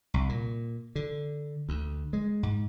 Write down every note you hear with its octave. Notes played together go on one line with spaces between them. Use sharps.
C2
A#2
D3
D2
G#3
G#2